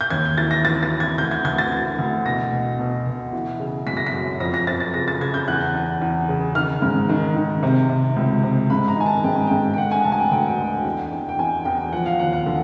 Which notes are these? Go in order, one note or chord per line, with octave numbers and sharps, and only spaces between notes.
G6
D#2 G#6
E3 A6
A#6
E3 A6
A6
E3
G#6
D2 G6
G#6
D2 G#6
A6
E3
D2
B2 A#6
B2
B2
B2
E3
C#3
F#2 B6
A#6
B6
F#2
F2 A#6
A#6
F2 A6
A6
C#3 A#6
A6
C#3 G#6
G6
E2 F#6
E2
E2
C#3
D#3 F6
G#2
D#3
D#3
C3
C3
C#2
C3
G#2 B5
A#5
D#3 G#5
A5
G#2 G5
G#5
G#2 G5
G5
D3 F#5
G#5
D2 A5
G#5
G5
D2 G5
D3
E2
E2
G5
E2 G#5
E2 G5
F3 F#5
F5
D#2 F#5
F#5
D3